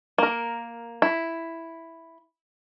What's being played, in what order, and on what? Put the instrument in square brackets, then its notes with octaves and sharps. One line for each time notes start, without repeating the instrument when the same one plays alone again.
[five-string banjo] A#3 A#4
E4